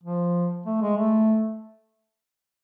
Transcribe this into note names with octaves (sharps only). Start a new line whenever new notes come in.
F3
A3
G#3
A3